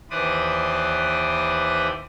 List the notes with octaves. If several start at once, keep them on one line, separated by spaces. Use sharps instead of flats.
D#2 E3 B4 C5 D5 D#6